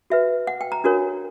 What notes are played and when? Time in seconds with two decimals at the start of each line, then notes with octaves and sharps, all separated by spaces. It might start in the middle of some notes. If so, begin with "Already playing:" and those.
0.10 F#4 B4 E5
0.47 F#5
0.61 G5
0.72 A#5
0.84 D4 F#4 A#4 C#5